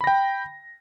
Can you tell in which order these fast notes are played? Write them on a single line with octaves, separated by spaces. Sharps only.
B5 A#6 G5